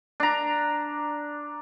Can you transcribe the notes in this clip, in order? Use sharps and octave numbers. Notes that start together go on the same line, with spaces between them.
D4 A#5